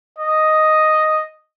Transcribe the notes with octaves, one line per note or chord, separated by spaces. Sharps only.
D#5